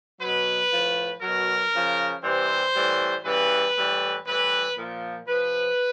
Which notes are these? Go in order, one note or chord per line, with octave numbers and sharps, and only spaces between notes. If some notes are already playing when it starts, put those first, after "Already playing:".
B2 F#3 B4
A2 F3
B2 F#3 A#4
C#3 F3
C3 E3 G3 C5
A2 E3 G3
C#3 E3 G3 B4
A2 E3 G3
A2 E3 G3 B4
A#2 F3
C3 F3 B4